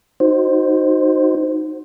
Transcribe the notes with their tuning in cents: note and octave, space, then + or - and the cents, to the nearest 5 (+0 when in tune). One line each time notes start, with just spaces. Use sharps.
D#4 -5 F#4 +0 C5 +0